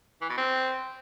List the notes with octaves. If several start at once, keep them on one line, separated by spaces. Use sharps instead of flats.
E3
B2
C4